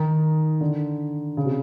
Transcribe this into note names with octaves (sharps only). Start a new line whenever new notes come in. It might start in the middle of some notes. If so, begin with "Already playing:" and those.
Already playing: D#3
D3
C#3
C3